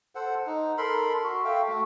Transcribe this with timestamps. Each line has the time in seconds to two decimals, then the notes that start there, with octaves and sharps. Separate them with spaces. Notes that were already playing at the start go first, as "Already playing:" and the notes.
0.15 A4 C5 F#5
0.46 D#4
0.78 A4 A#4 B5 C6
1.23 F#4
1.45 A4 E5 F5 G5
1.68 A3 F#4